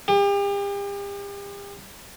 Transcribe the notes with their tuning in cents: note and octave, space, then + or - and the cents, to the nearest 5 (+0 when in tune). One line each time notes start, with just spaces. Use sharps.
G4 +40